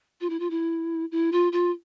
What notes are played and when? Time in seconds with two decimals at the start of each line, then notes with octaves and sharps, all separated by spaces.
0.21 F4
0.30 E4
0.40 F4
0.50 E4
1.12 E4
1.32 F4
1.52 F4